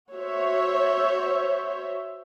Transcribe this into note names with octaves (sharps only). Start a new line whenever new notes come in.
F#4 C5 C#5 E5